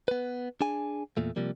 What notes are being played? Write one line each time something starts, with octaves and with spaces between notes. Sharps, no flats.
B3 B4
D4 G#4 G#5
E2 A#2 A3
C3 F3 G3 A#3